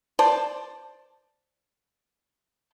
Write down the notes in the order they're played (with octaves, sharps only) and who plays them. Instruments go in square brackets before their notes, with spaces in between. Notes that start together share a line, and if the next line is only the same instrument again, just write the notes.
[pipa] C5 D5 A5